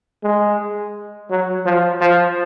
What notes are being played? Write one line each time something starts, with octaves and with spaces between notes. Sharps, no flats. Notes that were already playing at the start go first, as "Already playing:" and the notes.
G#3
F#3
F3
F3